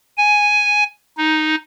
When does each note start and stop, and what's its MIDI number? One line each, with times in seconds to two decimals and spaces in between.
0.18 0.84 80
1.17 1.55 63